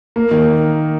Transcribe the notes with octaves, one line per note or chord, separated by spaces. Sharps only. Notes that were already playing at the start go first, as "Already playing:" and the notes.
A#3
D#3